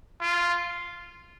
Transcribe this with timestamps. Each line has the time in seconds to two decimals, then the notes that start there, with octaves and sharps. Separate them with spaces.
0.21 F4